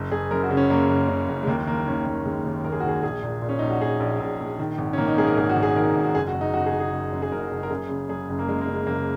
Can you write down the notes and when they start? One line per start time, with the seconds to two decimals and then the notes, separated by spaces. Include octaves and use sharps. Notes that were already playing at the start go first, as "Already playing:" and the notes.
Already playing: F#1
0.11 F#1 G#4
0.31 F#2 A#4
0.43 F#4
0.51 C#3
0.57 C#4
0.70 F#2 A#3
0.89 F#1
1.08 C#3
1.28 F#1
1.43 G#3
1.47 D#2 A#3
1.67 D#3 A#3
1.87 D#3 C#4
2.06 D#2 A#3
2.25 D#3 G#3
2.45 D#2
2.64 D#2 A#4
2.72 G#4
2.80 F#4
2.84 D#3 G#4
3.03 A#1 G#4
3.23 A#2
3.42 A#2
3.49 C#4
3.59 A#1 D#4
3.71 F#4
3.81 A#1 G#4
4.00 A#1
4.20 A#1
4.40 A#1
4.59 D#3
4.78 G#1
4.93 C#4
4.98 D#3 A#3
5.08 D#4
5.18 G#2 G#4
5.27 A#4
5.37 G#1 G#4
5.49 F#4
5.56 G#1
5.63 G#4
5.76 D#3 A#4
5.96 G#1
6.04 F#4
6.15 F#1 G#4
6.28 F#4
6.34 F#1
6.41 D#4
6.53 F#1 F#4
6.66 G#4
6.73 F#1
6.80 G#4
6.92 F#1
7.12 F#2
7.22 G#4
7.32 F#1 A#4
7.51 F#1
7.63 A#4
7.70 F#2 G#4
7.89 C#3
8.09 F#2 G#4
8.29 F#1
8.39 A#3
8.48 F#2 G#3
8.61 A#3
8.67 C#3
8.74 G#3
8.87 F#1 A#3